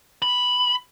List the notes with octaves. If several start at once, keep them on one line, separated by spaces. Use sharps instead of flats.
B5